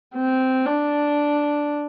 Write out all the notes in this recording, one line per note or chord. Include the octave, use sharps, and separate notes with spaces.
C4
D4